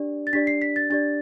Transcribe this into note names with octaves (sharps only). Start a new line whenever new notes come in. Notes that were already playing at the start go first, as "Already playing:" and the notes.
Already playing: D4 G4 D5
A6
D4 G4 D5 B6
C7
B6
A6
D4 G4 D5 A6